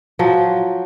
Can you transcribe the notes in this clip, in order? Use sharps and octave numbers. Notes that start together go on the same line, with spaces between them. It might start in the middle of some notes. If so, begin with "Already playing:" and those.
F3 F#3